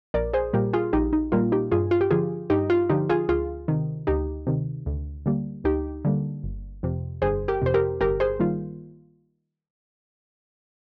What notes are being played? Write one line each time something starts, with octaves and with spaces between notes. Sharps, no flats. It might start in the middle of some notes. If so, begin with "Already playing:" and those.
A#1 A#4 D5
G#4 C5
A#2 G3 A#3 G4 A#4
F4 G#4
A#1 D#4 G4
D#4
A#2 G3 A#3 F4
D#4 G4
G2 F4 G#4
F4
G4
D3 F3 F4 G#4
G2 D#4 G4
F4
D3 F3 D#4 G4
F4 G#4
D2 F4 G#4
C3 D#3
D2 D#4 G4
C3 D#3
D2
D3 G3 A#3
D2 D#4 G4
D3 G3 A#3
G1
F2 C3
G1 G#4 C5
G4 A#4
F2 C3 C5
G4 A#4
G1 G4 A#4
G#4 C5
D#3 G3 A#3 F4